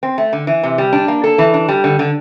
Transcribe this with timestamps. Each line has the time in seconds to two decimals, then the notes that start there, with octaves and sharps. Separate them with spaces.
0.03 C4
0.18 A3
0.33 D3
0.47 E3
0.63 C3
0.78 G3
0.93 D4
1.08 A#3
1.24 A4
1.38 E3
1.54 D4
1.69 G3
1.84 D3
1.99 D3